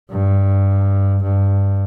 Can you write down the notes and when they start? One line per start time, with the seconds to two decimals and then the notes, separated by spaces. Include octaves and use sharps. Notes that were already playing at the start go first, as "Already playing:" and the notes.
0.11 G2
1.23 G2